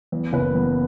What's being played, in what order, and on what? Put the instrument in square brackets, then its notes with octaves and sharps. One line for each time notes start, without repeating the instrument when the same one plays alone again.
[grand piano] E2
F#1 B4
E2